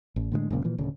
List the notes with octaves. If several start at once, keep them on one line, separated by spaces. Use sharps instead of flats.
A1
A2 D3 E3 G#3
F#1 C#2 A#2 C#3
A#2 E3 F3
D1 C#3